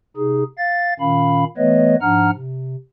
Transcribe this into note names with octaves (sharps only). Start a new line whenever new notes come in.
C3 D#4 G#4
F5 A6
A#2 D#3 C#4 F5 B5
E3 A3 B3 B4 C#5 D#5
G#2 F3 D4 F#5 A#5 F6
C3